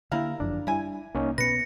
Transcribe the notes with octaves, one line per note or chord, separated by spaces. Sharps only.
D3 G3 A#3 E4 A#4 F5
G1 F#2 F3 D4
G3 E4 G#5
C2 A#3 C#4 D#4
B2 A#3 B3 B4 A#6 C#7